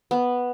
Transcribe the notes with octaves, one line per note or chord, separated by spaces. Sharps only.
B3